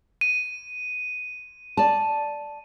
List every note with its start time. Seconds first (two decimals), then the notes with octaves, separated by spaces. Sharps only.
0.21 D#7
1.77 D5 A5